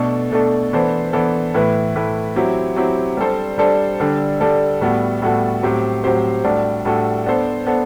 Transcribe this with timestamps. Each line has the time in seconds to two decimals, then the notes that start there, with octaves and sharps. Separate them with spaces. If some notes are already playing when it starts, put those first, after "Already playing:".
Already playing: B2 A3 D4 A4
0.32 B2 A3 D4 A4
0.73 E3 B3 D4 A4 C5
1.13 E3 B3 D4 A4 C5
1.54 A2 E3 A3 E4 B4
1.95 A2 E3 A3 E4 B4
2.36 F#3 C4 E4 G4
2.76 F#3 C4 E4 G4
3.17 G3 D4 A4 C5
3.58 G3 D4 A4 C5
4.00 D3 G3 D4 A4
4.40 D3 G3 D4 A4
4.81 A2 G3 B3 F#4 A4
5.22 A2 G3 B3 F#4 A4
5.62 A2 F#3 C4 G4 C5
6.04 A2 F#3 C4 G4 C5
6.44 A2 G3 D4 F#4 A4
6.85 A2 G3 D4 F#4 A4
7.26 B3 D4 A4 C5
7.66 B3 D4 A4 C5